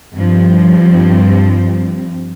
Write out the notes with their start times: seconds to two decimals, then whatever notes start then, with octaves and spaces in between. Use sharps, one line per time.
0.17 G2 F3 C4